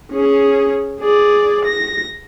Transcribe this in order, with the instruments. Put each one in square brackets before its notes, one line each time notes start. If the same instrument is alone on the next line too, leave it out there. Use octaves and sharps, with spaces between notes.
[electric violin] C#4 G#4
G#4 D5
A#6